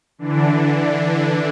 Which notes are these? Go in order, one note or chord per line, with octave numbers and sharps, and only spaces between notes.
D3 E3 D4